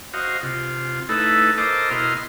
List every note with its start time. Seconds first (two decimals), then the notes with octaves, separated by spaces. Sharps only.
0.14 F#4 C5 D#5 F5
0.43 C3 F4
1.09 A3 D#4 E4 A4 B4
1.58 A4 A#4 C5 D#5 D6
1.91 B2 E4 A#4 D#5 C6 F6